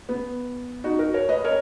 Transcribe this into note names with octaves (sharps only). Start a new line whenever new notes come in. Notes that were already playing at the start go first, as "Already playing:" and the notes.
B3
D#4 F#4
F#4 A#4
A#4 C#5
B4 D#5
A#4 C#5